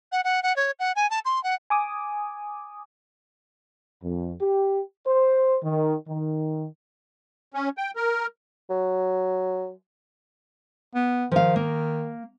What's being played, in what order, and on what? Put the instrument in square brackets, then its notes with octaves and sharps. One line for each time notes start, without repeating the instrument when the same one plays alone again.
[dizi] F#5
F#5
F#5
C#5
F#5
G#5
A5
C6
F#5
[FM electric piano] G#5 D6 D#6
[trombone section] F2
G4
C5
D#3
D#3
[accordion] C#4
G5
A#4
[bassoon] F#3
[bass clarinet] B3
[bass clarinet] D#3 [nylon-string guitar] F3 F5
[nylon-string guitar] A#3